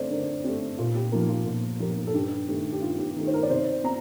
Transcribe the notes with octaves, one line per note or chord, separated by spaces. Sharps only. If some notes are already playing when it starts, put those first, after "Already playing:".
Already playing: D3 A3 C4 C5 D5
D3 A#4
A3 C4 G4
A#2 F4
G4
F3 A#3 F4
F4
A#2 F4
F3 A#3 G4
A4
G2 G4
D#3 A3 G4
G4
G2 F4
G4
D#3 A3
C5
A#4
D5
C3 C5
C4 A#5